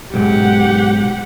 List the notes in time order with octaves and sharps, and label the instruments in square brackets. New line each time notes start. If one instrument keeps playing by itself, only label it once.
[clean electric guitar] B1 G#2 [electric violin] G4 F#5